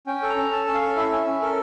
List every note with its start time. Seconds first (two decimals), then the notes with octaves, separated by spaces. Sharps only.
0.07 C#4 G5
0.22 A4
0.29 A#5
0.37 C#4
0.52 A4 A5
0.67 C#4
0.74 F5
0.82 A4
0.96 E4 E5
1.12 C#4
1.27 C#4
1.41 A4 A#4